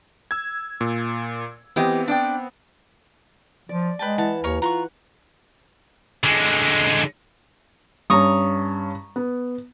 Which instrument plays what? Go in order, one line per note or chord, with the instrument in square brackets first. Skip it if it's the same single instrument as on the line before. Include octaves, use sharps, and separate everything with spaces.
[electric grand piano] E6 G#6
A#2
[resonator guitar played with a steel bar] E3 G4 D#5 [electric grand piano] B3 C4
[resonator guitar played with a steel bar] D4 D5 G5
[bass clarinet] F3 [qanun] D5
[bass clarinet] G#3 [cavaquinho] B4 G5 A5
[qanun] E3 [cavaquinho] F#5 A5
[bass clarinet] D#2 [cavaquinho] A#4 C#5
[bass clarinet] F4 [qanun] F#5 [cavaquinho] A#5 C6 C#6
[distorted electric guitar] D3 G#3
[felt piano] G2 C#4 [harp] A#5 C#6 D#6
[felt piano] B3